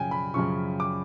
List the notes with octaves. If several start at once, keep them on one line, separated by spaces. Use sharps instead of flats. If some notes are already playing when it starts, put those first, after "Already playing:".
Already playing: F#2 C#3 F3 G5 G#5
B5
F#2 C#3 F3 C#6
D6